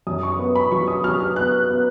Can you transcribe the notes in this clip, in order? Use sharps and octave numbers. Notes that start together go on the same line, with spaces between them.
F#2 D#6
C#6
B3
B5
F#3 C#6
D#6
F#3 F6
F6
B3 F#6
B3